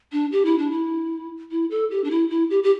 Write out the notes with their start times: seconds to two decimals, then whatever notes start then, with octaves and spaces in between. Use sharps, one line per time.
0.12 D4
0.32 G4
0.45 E4
0.58 D4
0.71 E4
1.51 E4
1.71 A4
1.91 G4
2.04 D4
2.11 E4
2.30 E4
2.50 G4
2.63 G4